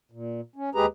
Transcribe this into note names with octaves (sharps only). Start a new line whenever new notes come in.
A#2
C#4
D#2 G#3 G4 G#4 B4 A#5